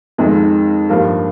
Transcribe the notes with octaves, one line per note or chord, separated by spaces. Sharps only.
F2 D#3 G#3
G2 F3 A#3 F4